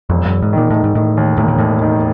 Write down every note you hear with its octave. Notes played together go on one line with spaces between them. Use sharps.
E1 F2
F#2
E1
G#2
A#2 D#3
A2 D#3
G#2
A2 D#3
D#2
E1 A2
A#2
D#2 A2
D#3